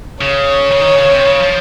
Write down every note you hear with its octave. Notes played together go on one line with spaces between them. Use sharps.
C#3 C#5
C#3
D#3
C#3
C3
C#3
F3